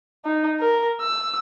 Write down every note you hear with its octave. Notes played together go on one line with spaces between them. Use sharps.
D#4
A#4
E6